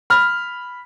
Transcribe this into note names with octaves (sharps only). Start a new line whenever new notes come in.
B5 F6